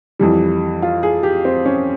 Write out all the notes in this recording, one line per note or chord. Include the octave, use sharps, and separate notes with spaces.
F2 E3 G3
F4
G#4
G4
C4
C#4